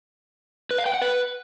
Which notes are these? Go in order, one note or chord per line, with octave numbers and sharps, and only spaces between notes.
B4
F5
G5
F#5
B4